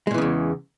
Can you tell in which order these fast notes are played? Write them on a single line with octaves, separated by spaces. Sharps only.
G#3 A#2 E3 C#3 E2